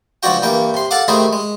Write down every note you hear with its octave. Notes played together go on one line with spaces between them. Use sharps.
C#2 F3 D4 F#4 G5
G2 E3 A#3 G5
C3 C6
A4 F5 F#5 D6
C3 D#3 A3 C4 E4 G#4
G#3